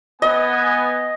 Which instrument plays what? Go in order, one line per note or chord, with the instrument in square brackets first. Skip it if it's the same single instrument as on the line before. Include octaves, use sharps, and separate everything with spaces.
[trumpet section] B3 G#5 [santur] D#5